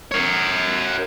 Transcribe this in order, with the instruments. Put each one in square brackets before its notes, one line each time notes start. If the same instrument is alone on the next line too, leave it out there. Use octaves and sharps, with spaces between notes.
[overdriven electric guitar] A#4 C#5